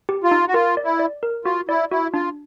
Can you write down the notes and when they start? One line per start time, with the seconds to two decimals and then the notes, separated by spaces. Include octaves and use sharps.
0.09 G4
0.24 F4
0.31 D#4
0.48 F#4
0.53 F4 A#4
0.77 D5
0.84 E4
0.99 D5
1.23 A#4
1.45 F4 F#4
1.69 E4 D5
1.91 E4 F#4
2.13 D4 F4